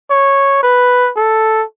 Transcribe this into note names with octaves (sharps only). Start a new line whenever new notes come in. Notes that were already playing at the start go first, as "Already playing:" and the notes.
C#5
B4
A4